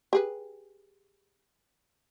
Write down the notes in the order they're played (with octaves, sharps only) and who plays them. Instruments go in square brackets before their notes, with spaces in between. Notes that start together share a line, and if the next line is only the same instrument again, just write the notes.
[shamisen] G4 G#4 B4